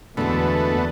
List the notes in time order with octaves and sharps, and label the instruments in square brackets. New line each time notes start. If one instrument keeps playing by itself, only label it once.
[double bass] E2 [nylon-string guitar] D3 G#3 F#4 [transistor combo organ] A3 B3